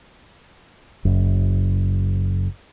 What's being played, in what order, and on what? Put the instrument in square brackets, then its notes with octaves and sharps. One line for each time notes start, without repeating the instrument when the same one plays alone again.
[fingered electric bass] F#1 F#2